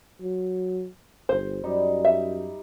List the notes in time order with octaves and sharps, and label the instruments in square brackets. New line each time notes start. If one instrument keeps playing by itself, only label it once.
[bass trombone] F#3
[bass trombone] G1 [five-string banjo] C5
[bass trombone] F#2 [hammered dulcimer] G3 D#4
[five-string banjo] E5